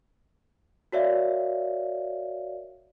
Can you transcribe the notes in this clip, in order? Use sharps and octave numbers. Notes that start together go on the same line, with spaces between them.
F#4 A#4 C#5 D5 E5 F5